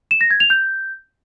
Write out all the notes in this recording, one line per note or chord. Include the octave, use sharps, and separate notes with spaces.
E7
A#6
G#6
F7
G6